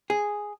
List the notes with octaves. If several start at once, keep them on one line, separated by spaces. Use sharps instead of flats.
G#4